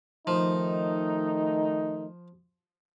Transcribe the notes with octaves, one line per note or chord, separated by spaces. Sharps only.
D#3 F3 A3 D#4